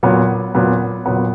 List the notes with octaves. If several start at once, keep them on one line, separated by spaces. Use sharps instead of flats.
A#2 F#3 B3
A#2 F#3 B3
A#2 F#3 B3